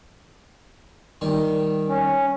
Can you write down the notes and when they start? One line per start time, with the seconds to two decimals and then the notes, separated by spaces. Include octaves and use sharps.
1.21 D#3 G3
1.89 C#4